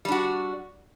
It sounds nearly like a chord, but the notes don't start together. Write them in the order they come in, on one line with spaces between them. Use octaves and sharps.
G3 D4 F#4